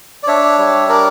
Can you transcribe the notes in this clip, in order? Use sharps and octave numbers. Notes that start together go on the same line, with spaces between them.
D5
D4 C#5 E5
G3
D4 A#4 D5